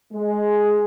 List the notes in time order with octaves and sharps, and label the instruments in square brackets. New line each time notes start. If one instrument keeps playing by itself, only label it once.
[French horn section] G#3